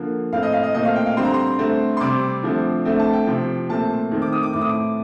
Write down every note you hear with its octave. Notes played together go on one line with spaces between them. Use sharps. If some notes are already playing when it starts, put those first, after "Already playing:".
Already playing: D3 F3 A#3
A2 A3 C4 F5
D#5
F5
D#5
A#2 A3 C4 D#5
F5
G5
F5
D3 G3 C4 C6
A#5
C6
D3 A3 C4
C6
C3 G3 C4 D6
D3 F3 A3 C4
D3 A3 C4
A5
G5
C3 F3 C4
A#2 A3 C4 A5
D#3 A3 C4
D6
D#6
D6
A2 A3 C4 D6
D#6
D6